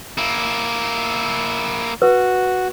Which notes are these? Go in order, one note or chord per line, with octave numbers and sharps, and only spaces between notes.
A#3 E4
F#4 B4